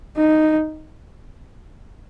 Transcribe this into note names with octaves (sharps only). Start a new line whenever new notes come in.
D#4